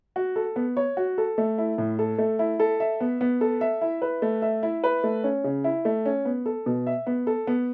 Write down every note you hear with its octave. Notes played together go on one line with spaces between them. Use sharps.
F#4
A4
B3
C#5
F#4
A4
A3
E4
A2
A4
A3
E4
A4
E5
B3
B3
A4
E5
E4
B4
A3
E5
E4
B4
A3
C#4
C#3
E4
A3
C#4
B3
A4
B2
E5
B3
A4
B3